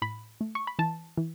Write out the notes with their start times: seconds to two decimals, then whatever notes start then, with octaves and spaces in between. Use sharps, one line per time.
0.02 A2 B5
0.41 A3
0.55 C#6
0.67 B5
0.79 E3 A5
1.18 E3